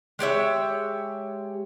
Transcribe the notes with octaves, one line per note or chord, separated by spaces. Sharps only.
G#3 G4 C#5 E5